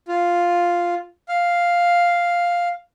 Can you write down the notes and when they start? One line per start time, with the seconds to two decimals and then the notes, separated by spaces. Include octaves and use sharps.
0.08 F4
1.29 F5